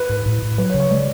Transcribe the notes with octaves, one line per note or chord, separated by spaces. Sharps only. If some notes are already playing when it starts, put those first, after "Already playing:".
Already playing: B4
G#2
A2
A2
F#3 B4
C#5
C#3
C#5
G#3 D5